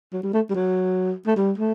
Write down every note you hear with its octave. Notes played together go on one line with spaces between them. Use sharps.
F#3
G3
A3
G3
F#3
A3
G3
A3